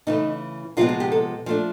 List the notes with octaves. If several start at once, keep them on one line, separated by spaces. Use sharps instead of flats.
C#3 E3 A3 D#4
C3 F3 G#3 B3 F4
F#4
G4
A4
F3 A3 D4